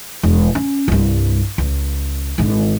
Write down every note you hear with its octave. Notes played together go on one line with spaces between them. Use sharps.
E1
C#4
C2 G2
C#2
G#1 D3